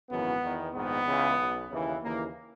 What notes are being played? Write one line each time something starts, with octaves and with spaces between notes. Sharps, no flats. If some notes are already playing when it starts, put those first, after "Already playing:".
G#1 F#2 C#3 E3 B3
E2 D#3
A#1 G#2 D#3 B3
C#2 C#3 E3
B1 B2
D#2 C#3 E3
D#2 C#3 E3 A#3